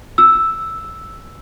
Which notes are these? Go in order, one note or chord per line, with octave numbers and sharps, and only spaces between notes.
E6